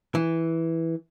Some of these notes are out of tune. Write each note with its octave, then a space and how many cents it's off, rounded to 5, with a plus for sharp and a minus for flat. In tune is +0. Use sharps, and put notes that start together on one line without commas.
E3 -5